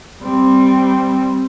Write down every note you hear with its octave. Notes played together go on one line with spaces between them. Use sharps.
G3 C4